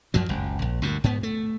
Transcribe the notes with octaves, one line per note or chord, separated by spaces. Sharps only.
F#2 F3 F#3
F#1 C#2
A#1
D2 G2 A#2
G#2 B3
A3